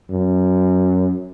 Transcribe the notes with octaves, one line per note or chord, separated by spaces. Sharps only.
F#2